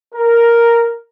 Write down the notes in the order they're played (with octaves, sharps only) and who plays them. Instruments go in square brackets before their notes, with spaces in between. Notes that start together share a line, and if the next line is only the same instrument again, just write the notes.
[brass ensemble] A#4